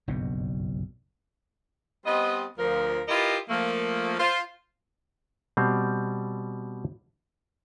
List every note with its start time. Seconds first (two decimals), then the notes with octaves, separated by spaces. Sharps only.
0.08 F#1 B1 G2 B2
2.06 G3 B3 C4 C5 D#5
2.59 D2 F3 A#4
3.08 E4 F4 G4 A#4 B4 D#5
3.49 F3 A3 A#3
4.19 F4 C5
5.57 B2 G3 C4